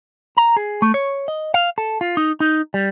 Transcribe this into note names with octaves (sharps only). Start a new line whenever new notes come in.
A#5
G#4
A3
C#5
D#5
F5
A4
F4
D#4
D#4
G3